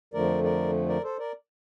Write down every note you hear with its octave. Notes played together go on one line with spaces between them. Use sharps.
F2 D3 F3 A3 A#4 D5
A#4 D5
A#4 D5
A4 C5
A#4 D5